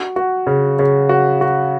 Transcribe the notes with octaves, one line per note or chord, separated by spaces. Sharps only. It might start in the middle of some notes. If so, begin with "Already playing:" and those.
Already playing: F#4
F#4
C#3
C#3
F#4
F#4